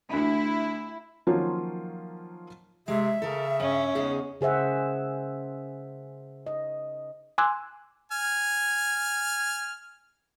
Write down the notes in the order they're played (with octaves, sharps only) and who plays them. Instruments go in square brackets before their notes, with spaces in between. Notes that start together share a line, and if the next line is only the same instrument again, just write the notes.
[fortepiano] D2 [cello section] E4
[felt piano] D#3 F3 F#3 A#3 C#4 F4
[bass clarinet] C3 [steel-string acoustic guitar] G#3 [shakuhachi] E5
[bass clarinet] C#3 [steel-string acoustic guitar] A4 A#4
[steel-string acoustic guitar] G2 [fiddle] C#4
[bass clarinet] E2 [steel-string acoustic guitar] C#3 D#4 G#4
[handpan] C#3 G#4 C5 E5 F#5
D#5
[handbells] G#5 C6 D6 E6 F#6 G#6
[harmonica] G#5 F6